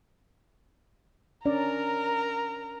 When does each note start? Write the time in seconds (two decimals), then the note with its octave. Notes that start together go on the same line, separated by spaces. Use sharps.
1.45 C#4 D4 A#4 D5 A#5